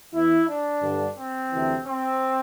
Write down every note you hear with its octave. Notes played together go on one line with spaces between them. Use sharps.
E2 E3 E4
D4
G2 D3
C4
D2 C3 E3
C4